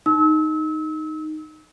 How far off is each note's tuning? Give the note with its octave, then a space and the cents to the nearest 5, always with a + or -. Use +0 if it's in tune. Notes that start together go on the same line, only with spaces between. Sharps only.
D#4 -5 E6 -35